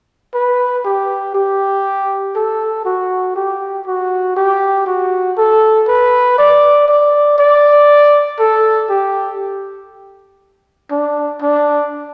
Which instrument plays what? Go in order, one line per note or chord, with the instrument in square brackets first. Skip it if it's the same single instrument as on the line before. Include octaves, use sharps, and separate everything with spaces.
[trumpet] B4
G4
G4
A4
F#4
G4
F#4
G4
F#4
A4
B4
D5
D5
D5
A4
G4
D4
D4